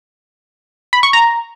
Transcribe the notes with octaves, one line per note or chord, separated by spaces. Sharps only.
B5
C#6
A#5